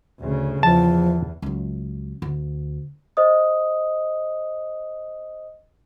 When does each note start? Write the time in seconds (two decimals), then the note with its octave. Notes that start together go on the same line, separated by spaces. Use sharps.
0.20 D2 C#3
0.63 E2 F3 A5
1.42 C#2 F#3
2.22 D2
3.17 C5 D#5 D#6